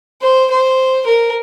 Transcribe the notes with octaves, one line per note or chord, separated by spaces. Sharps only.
C5
C5
A#4